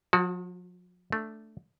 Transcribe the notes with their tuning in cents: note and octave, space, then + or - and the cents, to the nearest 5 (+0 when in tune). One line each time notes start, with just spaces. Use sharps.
F3 +45 F#4 +0
A3 +0 D4 +0